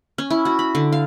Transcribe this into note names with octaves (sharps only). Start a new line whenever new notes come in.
C#4
E4
F#4
B5
D3
F5